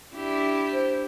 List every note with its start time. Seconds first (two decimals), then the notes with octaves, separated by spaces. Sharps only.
0.14 D4 E4 G4
0.72 C5